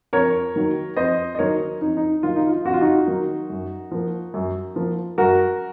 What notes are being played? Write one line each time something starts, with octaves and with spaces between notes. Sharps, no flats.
F2 A#4 C#5
D#3 F#3 A#3
F2 C5 D#5
D#5
D#3 F#3 A#3 A#4 C#5
F2 D#4
D#4
D#3 F#3 A#3 F4
D#4
F4
F2 F#4
F4
D#4 F#4
D#3 F#3 A#3
F#2
F3 A#3
F#2
F3 A#3
F#2 F#4 A#4